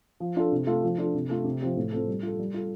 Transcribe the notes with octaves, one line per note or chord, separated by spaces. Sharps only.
F3
D4 F4 A4
C3
A3 F4 A4
F3
D4 F4 A4
C3
A3 F4 A4
C3
F3 C4 G4
A2
A3 C4 F4 A4
G3
F4 A4
G3
F4 A4